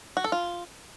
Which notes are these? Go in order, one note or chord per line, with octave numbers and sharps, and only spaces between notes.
F#4
A4
F4